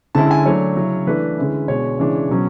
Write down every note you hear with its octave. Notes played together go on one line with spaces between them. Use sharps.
D3 G#3 C#4 E4 A5
G#5
F#3 A3 D4 C#5
C#3 F#3 C#4 E4
E3 A3 D4 B4
D3 G#3 C#4 E4
B2 G#3 D4 C#5
C#3 E3 G#3 D4
B2 F#3 C#4